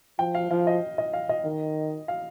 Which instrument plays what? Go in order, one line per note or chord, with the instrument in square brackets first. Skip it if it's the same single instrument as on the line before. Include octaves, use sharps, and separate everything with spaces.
[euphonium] F3 [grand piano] G5
[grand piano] F5
[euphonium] F3 [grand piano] F5
[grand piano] D#5
D#5
F5
D#5
[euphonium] D#3
[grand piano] F5